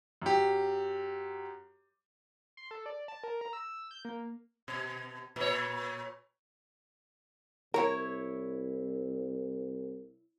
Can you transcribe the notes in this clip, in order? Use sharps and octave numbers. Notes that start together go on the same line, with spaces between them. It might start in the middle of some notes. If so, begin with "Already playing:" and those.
F#2 G4
C6
A4
D5
A5
A#4
A#5
E6
G6
A#3
B2
A#2 C#5
C2 E4 A#4 C#5